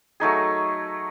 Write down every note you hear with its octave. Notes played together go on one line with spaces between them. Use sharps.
F#3 A3 D#4 G#4